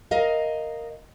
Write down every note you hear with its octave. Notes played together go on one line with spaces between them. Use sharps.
A#4 D#5 F5